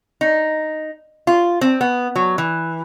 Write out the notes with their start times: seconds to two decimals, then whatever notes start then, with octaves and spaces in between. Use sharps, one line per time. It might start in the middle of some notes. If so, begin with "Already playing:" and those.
0.21 D#4
1.27 F4
1.61 C4
1.81 B3
2.16 F#3
2.38 E3